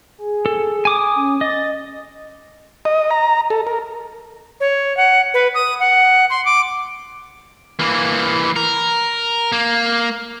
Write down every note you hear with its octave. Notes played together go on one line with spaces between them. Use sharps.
G#4
A4
G#5 D6 D#6
C#4
D#5 A6
D#5
A#5
A4
A#4
C#5
F#5
B4
D#6
F#5
C6
D6
E3 A#3
A#4
A#3